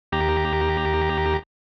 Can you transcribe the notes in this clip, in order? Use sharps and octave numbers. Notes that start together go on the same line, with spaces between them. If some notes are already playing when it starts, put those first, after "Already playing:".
D#2 G4 A#5